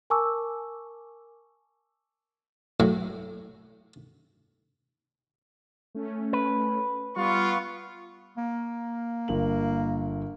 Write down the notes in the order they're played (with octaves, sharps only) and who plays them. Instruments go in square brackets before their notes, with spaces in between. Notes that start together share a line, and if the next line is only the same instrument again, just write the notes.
[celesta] A#4 G#5 A5 C#6 D6 E6
[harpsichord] A2 F#3
[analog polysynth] A3 C#4
[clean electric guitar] B4
[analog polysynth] G3 [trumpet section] B3 F4 [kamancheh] C#6
[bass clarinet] A#3
[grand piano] G1 A#4 F#7